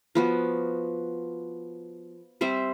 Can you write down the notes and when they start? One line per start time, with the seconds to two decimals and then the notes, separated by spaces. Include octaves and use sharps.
0.15 F3 B3 F#4
2.41 G3 C4 C5 E5